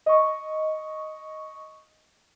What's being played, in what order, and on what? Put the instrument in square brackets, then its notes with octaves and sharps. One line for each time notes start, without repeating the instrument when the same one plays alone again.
[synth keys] D#5 C#6